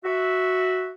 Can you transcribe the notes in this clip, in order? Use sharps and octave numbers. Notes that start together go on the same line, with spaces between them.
F#4 E5